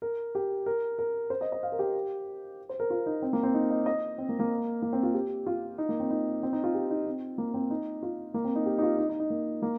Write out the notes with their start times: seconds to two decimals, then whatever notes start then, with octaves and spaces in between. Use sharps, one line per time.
0.02 A#4
0.35 G4
0.66 A#4
0.99 A#4
1.30 C5
1.41 D#5
1.52 D#5
1.63 F5
1.72 A#4
1.79 G4
2.69 C5
2.80 A#4
2.90 F4
3.06 D#4
3.22 C4
3.33 A#3
3.43 C4
3.54 D#4
3.70 D#5
3.86 D#5
4.18 C4
4.29 A#3
4.39 A#3
4.82 A#3
4.93 C4
5.03 F4
5.14 G4
5.46 F4
5.78 D#4
5.89 A#3
6.00 C4
6.11 D#4
6.43 C4
6.53 D#4
6.63 F4
6.74 G4
6.90 D#4
7.07 C4
7.38 A#3
7.54 C4
7.70 D#4
8.03 F4
8.34 A#3
8.44 C4
8.55 D#4
8.66 G4
8.78 D#4
8.82 F4
8.98 D#4
9.09 D#4
9.20 D#4
9.30 A#3
9.62 A#3